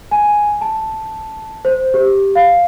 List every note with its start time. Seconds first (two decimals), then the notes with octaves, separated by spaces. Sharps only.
0.11 G#5
0.61 A5
1.65 C5
1.94 G4
2.35 F5